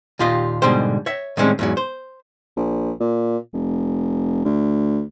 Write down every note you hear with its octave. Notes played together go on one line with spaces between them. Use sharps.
D#2 A#2 F4 G4 D#5
G#2 B2 D3 G3 C5
C#5 E5
A2 D#3 G3 G#3 C4 C#4
E2 G#2 F#3
C5
A#1
A#2
F1
D2